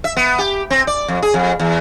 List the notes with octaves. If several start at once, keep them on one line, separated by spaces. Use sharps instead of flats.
E5
B3
G4
C4
D5
F2
G#4
F2
E2